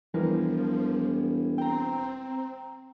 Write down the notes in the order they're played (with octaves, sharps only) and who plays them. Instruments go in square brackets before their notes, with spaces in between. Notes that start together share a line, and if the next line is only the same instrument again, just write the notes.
[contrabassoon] E1 [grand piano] E3 [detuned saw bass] F3 [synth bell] G3 A#4
[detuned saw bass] C4 [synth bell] G5 A#5